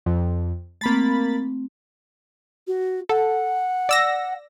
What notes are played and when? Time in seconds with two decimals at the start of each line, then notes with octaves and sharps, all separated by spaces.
0.06 F2
0.81 A3 A#3 C4 B5 A6
2.67 F#4
3.09 A4 F#5
3.89 D5 E6 A#6